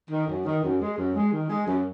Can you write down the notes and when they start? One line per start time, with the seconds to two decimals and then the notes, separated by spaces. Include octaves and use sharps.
0.10 D#3
0.28 F#2
0.45 D#3
0.62 F#2
0.80 G#3
0.98 F#2
1.15 G#3
1.32 D#3
1.50 G#3
1.67 F#2